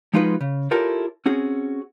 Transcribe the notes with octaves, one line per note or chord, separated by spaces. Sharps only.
F3 G#3 D#4 F4 F#4 B4
C#3
E4 F4 G4 A4 A#4 C#5
C4 C#4 F#4 G#4